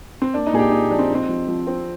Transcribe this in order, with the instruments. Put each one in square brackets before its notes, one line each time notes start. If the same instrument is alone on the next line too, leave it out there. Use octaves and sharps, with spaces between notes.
[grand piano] C4
[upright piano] A#3 [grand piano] D4
[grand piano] D#4
[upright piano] A#2 [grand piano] G#4
[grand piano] G4
[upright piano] A#2 [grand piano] D#4
[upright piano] F3 [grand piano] D4
[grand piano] C4
[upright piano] D#4
[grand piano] C4
[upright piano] F3
F3
C4